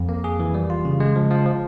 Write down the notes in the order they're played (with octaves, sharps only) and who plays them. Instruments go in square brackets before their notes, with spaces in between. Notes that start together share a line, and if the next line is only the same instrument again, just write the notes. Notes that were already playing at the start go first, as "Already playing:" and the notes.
Already playing: [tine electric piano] F2
A#3
G#4
E3
G3
F4
C#3
G#3
F3
F3
F3